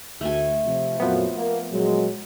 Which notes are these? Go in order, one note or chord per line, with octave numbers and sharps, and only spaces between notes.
D2 A3 G#5
C3 F3
F2 A#2 F3 F#3 B3
A#3
A#2 F#3 G#3